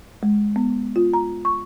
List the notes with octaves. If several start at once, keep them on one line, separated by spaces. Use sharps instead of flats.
G#3
B3
F4
A#5
C#6